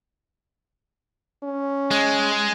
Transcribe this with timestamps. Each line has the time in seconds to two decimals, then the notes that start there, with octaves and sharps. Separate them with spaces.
1.43 C#4
1.91 G#3